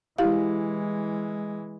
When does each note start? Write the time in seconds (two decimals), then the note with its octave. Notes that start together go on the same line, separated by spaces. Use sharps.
0.18 E3 G#3 E4 G4 F5